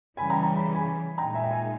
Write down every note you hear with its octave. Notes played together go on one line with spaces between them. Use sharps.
C#3 E3 G3 G#5 B5
G5 A#5
G5 A#5
B5
G#5 B5
A#2 G#3 D#4 G5 A#5
E5 G#5
G5
E5 G#5